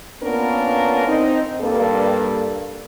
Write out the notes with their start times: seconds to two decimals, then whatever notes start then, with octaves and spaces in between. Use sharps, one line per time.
0.23 A#3 B3 C#4 D4 F4 A#4
1.07 C4 D#4
1.60 G2 A#3 A4